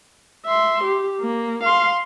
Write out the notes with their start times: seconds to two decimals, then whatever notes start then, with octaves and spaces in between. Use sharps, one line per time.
0.46 E5 C6
0.84 G4
1.21 A#3
1.64 F5 C6